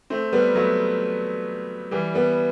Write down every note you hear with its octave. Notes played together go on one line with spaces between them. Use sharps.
A3 C4
G3 B3
F#3 A3
E3 G3
G3 B3